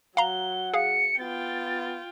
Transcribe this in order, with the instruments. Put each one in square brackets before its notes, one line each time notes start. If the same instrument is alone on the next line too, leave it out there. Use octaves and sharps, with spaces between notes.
[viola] F#3 [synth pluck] F5 A#5 [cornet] F#5 [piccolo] G7
[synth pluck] G#4 F5 [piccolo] C#7
[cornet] B3 [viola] F4 G5 [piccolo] A6